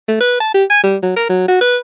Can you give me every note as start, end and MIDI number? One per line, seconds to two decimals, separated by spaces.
0.08 0.16 57
0.21 0.37 71
0.40 0.52 81
0.54 0.64 67
0.70 0.83 80
0.84 0.97 55
1.03 1.12 54
1.16 1.25 70
1.29 1.44 54
1.48 1.61 66
1.61 1.78 71